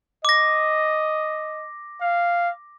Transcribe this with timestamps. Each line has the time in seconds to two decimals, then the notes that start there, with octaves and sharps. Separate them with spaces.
0.25 D#5 D6 A#6
2.01 F5